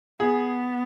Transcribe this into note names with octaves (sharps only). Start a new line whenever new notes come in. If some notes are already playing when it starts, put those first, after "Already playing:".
B3 G#4